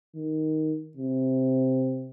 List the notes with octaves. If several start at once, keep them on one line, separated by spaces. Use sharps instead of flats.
D#3
C3